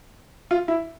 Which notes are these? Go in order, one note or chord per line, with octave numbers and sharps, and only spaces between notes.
F4
E4